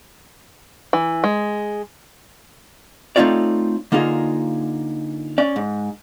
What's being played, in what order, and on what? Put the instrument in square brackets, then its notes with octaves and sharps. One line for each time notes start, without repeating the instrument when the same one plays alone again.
[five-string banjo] E3
G#3
[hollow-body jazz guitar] A3 C4 D#4 F4 C#5 D5
D3 A#3 D#4 F4 G#4
C#4 D5
G#2